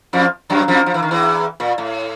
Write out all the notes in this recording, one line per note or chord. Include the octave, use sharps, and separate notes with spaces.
F2 F3
F#2 F#3
F2 F3
F3
E3
D#3
E2 E3
A#2
A2